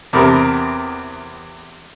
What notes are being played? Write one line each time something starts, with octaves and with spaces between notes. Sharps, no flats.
E2 C3 A#4 A5 A#5